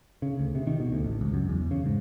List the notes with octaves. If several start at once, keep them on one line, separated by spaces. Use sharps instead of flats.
C#3
D2
C3
D#3
B2
D2
A1
C#2
F#2
E2
C#3
G#2